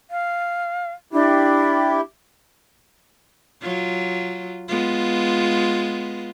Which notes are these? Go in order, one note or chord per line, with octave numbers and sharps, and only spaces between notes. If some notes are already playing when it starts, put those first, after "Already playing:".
F5
D4 E4 G4
F#3 F4
G#3 B3 F4